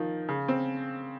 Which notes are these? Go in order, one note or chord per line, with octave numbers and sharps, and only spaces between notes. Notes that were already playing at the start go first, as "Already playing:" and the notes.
Already playing: D#3 F3
C#3
C4